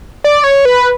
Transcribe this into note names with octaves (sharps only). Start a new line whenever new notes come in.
D5
C#5
B4